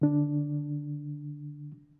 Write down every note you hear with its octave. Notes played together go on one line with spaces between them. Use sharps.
D3 D4